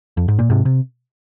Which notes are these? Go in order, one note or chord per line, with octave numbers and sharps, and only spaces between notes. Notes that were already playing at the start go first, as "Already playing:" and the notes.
F2
G#2
A#2
G#2 C3
C3